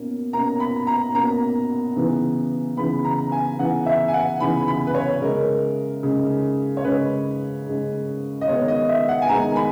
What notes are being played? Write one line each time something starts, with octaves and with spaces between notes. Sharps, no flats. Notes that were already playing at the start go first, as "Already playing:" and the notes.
Already playing: B2 A#3 C#4
B2 A#3 C#4 A#5
B5
A#5
B2 A#3 C#4 A#5
C#3 E3 B3
C#3 E3 B3 B5
A#5
G#5
C#3 E3 B3 F#5
E5
G#5
F#5
C#3 E3 B3 B5
B5
B4
C#5
C#3 G#3 C#4 A#4
C#3 G#3 C#4
C#5
C#3 G#3 C#4 B4
C#3 G#3 C#4
D#5
D#3 G#3 B3 C#5
D#5
E5
F#5
G#5
D#3 G#3 B3 A#5
B5